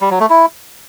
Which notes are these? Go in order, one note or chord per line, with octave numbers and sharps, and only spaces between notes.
G3
F#3
A3
E4